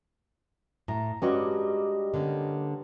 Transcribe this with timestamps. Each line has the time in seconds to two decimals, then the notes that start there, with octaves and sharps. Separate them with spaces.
0.88 A2 A#5
1.22 G2 G3 G#3 C#4 F#4 D#5
2.14 D3 A#3 C#4